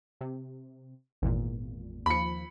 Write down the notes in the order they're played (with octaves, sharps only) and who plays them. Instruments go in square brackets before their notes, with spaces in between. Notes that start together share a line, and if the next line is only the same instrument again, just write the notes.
[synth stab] C3
G#1 E2 A#2
[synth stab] D#2 F3 [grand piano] B5 C#7